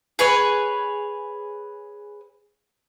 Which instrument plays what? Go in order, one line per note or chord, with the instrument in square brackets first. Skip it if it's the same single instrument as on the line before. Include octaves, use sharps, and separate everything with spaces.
[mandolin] G#4 B4 C#5 G#5